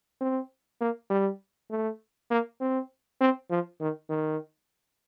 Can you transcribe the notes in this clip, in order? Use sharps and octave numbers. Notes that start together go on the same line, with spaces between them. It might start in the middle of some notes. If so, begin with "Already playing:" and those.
C4
A#3
G3
A3
A#3
C4
C4
F3
D#3
D#3